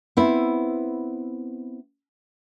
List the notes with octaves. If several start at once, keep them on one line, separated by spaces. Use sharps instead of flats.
B3 C4 E4